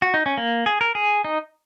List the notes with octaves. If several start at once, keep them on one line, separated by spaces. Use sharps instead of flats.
F#4
D#4
C#4
A#3
G#4
A#4
G#4
D#4